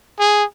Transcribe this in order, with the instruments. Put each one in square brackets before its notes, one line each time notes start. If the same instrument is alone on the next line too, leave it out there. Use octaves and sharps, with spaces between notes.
[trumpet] G#4